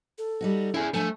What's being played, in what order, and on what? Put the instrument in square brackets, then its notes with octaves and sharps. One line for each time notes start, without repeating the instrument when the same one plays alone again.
[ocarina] A4
[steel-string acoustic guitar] G3 D#4 F#4
[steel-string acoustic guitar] C#4 [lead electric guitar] E4 G#4
[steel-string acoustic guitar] F3 G#5 [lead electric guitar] A3 [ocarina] D4